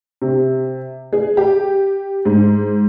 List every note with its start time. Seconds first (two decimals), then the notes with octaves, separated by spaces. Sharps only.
0.22 C3
1.13 G#4
1.37 G4
2.25 G#2